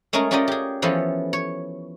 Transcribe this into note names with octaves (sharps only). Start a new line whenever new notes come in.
G#3 A3 C#4 G#4 A#4
C#4 F4 G4 A#4 D5 D#5
G4 G#4
E3 F3 B3 C#4 A4
C#5